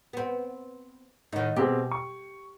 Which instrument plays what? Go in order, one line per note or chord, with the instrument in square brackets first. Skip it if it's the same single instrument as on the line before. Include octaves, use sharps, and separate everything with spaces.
[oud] B3 C4
[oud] A2 D#3 [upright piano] D#4 F#5
[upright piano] B2 C4 G#4 [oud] G4
[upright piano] C#6